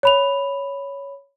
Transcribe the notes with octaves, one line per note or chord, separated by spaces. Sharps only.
C#5 B5 F7